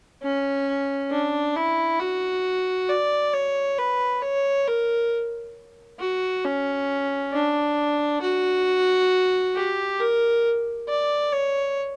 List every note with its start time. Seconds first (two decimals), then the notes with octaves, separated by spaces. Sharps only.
0.23 C#4
1.11 D4
1.56 E4
1.99 F#4
2.89 D5
3.33 C#5
3.78 B4
4.22 C#5
4.67 A#4
5.99 F#4
6.45 C#4
7.33 D4
8.21 F#4
9.55 G4
10.00 A#4
10.88 D5
11.33 C#5